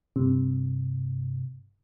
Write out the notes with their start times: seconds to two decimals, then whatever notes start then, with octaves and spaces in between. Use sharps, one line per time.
0.16 G2 C3